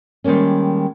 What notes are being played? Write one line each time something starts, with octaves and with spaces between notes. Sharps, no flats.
D#3 G3 G#3 A#3 C#4